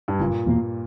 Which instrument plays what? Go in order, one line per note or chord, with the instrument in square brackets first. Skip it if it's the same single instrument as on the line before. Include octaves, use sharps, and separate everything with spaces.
[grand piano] G2
[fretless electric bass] F#1 [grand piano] A#2
[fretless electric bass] E2 B2 A#3